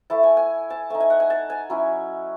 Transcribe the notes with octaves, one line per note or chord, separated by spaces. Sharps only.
A3 E4 A5
G#5
G#5
A5
A3 D#4 G#5
G#5
F#5
G#5
A5
G#5
F#3 C#4 E4